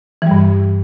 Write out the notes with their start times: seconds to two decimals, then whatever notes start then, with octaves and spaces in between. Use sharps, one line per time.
0.22 E3
0.27 G3
0.31 G2